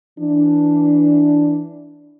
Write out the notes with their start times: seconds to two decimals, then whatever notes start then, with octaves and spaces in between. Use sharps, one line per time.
0.20 E3 D4